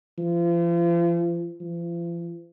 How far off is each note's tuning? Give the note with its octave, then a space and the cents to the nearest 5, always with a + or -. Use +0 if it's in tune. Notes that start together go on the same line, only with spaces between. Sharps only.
F3 -40
F3 -40